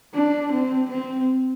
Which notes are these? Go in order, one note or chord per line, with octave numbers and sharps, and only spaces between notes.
D4
C4
C4